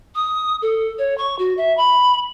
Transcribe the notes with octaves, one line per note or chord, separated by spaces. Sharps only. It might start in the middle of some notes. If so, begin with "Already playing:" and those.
D#6
A4
C#5
C#6
F#4
E5
B5